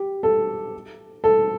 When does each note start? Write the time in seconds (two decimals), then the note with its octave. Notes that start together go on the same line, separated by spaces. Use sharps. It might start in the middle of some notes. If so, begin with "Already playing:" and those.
Already playing: G4
0.23 A4
1.24 A4